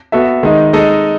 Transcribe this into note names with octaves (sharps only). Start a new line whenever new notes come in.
B3 F#4 A4 E5
D#3 G#3 D#4
G#3 D#4 A4 D#5